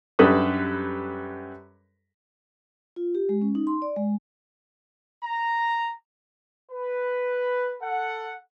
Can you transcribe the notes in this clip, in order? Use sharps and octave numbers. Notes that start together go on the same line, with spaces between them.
F#2 G3 D4 A4 B4 D#6
F4
G4
G#3
C#4
D#4
C6
D5
G#3
A#5
B4
A4 F#5